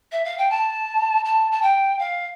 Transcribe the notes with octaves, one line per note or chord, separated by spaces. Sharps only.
E5
F5
G5
A5
A5
A5
G5
F5